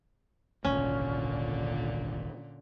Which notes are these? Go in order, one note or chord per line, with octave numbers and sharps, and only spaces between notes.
D#1 G#1 C#2 A#2 D3 C#4